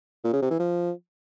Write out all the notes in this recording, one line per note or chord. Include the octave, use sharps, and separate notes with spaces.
A#2
C#3
C3
E3
F3